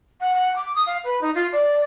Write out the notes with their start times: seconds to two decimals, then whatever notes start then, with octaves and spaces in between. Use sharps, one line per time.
0.20 F#5
0.34 F#5
0.56 D6
0.75 D#6
0.86 F5
1.04 B4
1.21 D#4
1.35 F4
1.52 D5